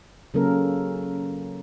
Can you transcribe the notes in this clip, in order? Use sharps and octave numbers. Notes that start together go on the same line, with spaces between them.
C#3 F#3 A#3 C#4 A4 A#4